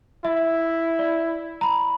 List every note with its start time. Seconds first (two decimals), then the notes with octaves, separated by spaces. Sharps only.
0.25 E4 E5
0.99 D5
1.61 A#5 B5